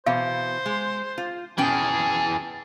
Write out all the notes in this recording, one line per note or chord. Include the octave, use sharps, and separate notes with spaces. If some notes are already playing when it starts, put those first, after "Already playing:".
B2 E3 C5 F5
G#3
F4
B2 E3 C#4 G#4 G5 A5